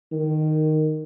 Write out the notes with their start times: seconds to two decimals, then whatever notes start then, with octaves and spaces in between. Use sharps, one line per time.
0.12 D#3